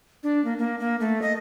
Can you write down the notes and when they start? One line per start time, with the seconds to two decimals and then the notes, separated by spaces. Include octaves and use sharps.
0.23 D4
0.45 A#3
0.58 A#3
0.79 A#3
1.00 A3
1.22 D#5